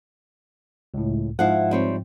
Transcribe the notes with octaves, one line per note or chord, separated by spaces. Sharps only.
C#2 A2
G#2 F3 E4 F5 F#5
G3 C4 C#5